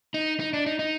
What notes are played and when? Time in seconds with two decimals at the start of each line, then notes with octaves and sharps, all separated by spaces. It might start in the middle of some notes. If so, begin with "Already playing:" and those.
0.14 D#4
0.40 D#4
0.54 D4
0.66 D#4
0.79 D#4